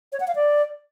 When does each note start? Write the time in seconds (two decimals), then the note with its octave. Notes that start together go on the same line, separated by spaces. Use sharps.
0.12 C#5
0.20 F#5
0.28 F5
0.35 D5